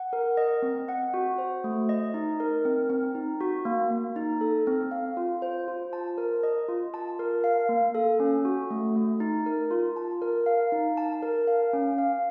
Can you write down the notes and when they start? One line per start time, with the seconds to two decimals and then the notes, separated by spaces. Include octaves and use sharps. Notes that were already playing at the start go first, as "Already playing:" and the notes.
Already playing: F#5
0.13 A#4
0.37 D#5
0.62 C4
0.88 F#5
1.14 F#4
1.38 C5
1.64 A3
1.89 D#5
2.14 D#4
2.40 A#4
2.65 C4
2.90 C4
3.15 D#4
3.41 F#4
3.65 A#3
3.90 A#3
4.16 D#4
4.41 A4
4.67 C4
4.91 F5
5.17 F4
5.42 C5
5.68 F4
5.93 A5
6.18 A#4
6.43 D#5
6.68 F4
6.94 A5
7.19 A#4
7.44 F5
7.69 A#3
7.95 A4
8.20 C#4
8.45 F#4
8.70 A3
8.96 A3
9.20 D#4
9.46 A#4
9.71 F4
9.96 A5
10.22 A#4
10.46 F5
10.72 D#4
10.97 A5
11.22 A#4
11.47 F5
11.73 C#4
11.98 F5